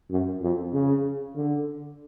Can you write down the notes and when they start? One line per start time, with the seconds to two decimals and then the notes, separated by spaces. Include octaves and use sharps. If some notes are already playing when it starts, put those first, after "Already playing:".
0.11 F#2
0.41 F2
0.73 C#3
1.36 D3